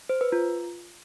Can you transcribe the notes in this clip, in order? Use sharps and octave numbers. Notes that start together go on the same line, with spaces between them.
C5
B4
F4